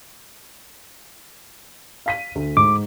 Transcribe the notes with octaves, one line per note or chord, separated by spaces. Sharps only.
F5 B6 D#7
D2
G#2 D6